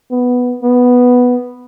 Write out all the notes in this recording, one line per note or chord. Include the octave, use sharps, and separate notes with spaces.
B3
B3